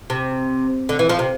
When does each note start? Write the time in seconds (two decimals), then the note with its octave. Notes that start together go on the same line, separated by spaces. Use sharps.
0.10 C3
0.89 D3
0.99 E3
1.09 F3
1.19 C3